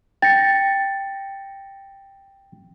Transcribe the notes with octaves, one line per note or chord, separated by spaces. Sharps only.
G5 A6 A#6 C#7